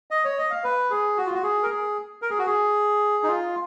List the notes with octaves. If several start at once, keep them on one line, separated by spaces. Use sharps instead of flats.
D#5
C#5
D#5
F5
B4
G#4
F#4
F4
F#4
G#4
A#4
G#4
A#4
G#4
F#4
G#4
D#4
F4